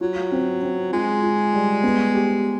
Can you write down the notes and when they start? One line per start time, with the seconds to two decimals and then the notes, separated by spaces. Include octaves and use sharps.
0.01 F#3 F4
0.32 C4
0.62 C4
0.93 G#3 F4
1.23 F4
1.53 G3
1.84 B3
2.14 G4